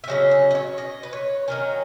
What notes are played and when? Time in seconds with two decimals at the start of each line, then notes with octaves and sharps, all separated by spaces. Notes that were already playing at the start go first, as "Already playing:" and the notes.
0.04 E5
0.08 C#3 F#3 C#4 D#5
0.31 D#5
0.51 D#5
0.55 C#5
0.78 D#5
1.03 B4
1.13 C#5
1.48 D#3 F#3 C#4 A#4